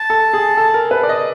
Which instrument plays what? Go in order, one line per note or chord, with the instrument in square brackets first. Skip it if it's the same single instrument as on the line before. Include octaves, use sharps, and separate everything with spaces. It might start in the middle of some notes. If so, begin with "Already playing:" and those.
Already playing: [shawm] A5
[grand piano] A4
G#4
A4
A#4
B4
D5
D#5